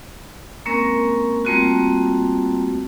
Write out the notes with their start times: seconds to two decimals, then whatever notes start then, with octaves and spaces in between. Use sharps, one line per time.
0.66 G#3 A#3 C4 C#4 A#4
1.45 G3 A3 A#3 C4 F4 F#4